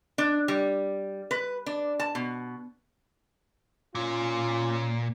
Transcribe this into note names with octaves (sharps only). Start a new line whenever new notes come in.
D4
G3
B4
D4
A5
B2
A#2 C#4 F4